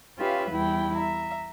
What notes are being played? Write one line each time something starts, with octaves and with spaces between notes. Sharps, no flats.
C#4 F4 G4 B4 E5 F5
E2 G3 E4 G5
E5 A#5